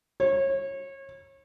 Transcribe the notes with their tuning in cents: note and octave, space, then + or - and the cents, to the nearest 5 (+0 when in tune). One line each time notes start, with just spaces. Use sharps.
C#5 -30